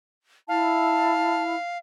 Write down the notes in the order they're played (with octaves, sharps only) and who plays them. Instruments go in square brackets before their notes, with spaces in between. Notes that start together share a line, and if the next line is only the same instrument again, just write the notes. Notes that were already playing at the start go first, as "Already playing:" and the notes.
[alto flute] E4 [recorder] F5 [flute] A5